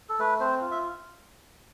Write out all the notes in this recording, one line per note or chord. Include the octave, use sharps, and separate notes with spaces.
A4
A3 B4
C4 C5
F4
E5